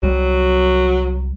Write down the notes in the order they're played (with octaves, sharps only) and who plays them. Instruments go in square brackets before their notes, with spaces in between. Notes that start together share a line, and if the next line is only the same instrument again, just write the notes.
[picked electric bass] C2 G3 [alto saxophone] F#3